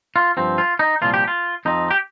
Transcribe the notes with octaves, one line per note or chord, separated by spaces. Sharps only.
F4
G2 F3 C4
F4
D#4
C2 A#2 F3 A#3 F4
G4
F4
F2 F3 C4 D#4
G4